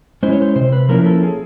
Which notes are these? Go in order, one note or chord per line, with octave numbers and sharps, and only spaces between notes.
G#3 C#4 E4 C5
C#5
C5
C3 C5
B4
F3 A#3 C#4 E4 A#4
A4
G#4